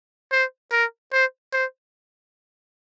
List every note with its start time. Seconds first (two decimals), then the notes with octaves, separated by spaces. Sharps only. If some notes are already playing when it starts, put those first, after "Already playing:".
0.32 C5
0.72 A#4
1.13 C5
1.53 C5